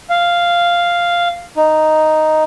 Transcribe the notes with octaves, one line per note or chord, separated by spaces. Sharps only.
F5
D#4